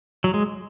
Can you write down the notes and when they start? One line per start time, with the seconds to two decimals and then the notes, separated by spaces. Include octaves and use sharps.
0.24 F#3
0.34 G#3